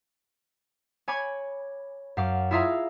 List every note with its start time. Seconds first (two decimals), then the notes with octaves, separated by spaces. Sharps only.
1.08 C#5 G#5 B5 D6 G#6
2.17 F#2 F5 D6
2.51 E4 F4 G#4 E5 F5 A#5